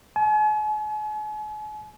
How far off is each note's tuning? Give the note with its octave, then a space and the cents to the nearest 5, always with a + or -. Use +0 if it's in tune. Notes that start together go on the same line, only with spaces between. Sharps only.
G#5 +45